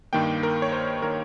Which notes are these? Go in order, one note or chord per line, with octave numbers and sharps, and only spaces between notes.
G2 D#3 A#3 G5
A#4
C#5
C5
D#3 A#3 A#4